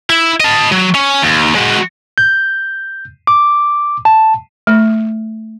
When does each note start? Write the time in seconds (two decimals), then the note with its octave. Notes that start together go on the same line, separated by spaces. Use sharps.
0.10 E4
0.40 D#5 A5
0.72 F#3
0.95 C#4
1.22 D#2
1.55 G#3 F#4
2.18 G6
3.27 D6
4.05 A5
4.67 A3